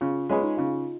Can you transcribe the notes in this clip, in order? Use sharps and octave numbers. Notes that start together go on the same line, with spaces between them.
C#3 F4
G#3 C#4 F4 G#4 B4
D#4
C#3 F4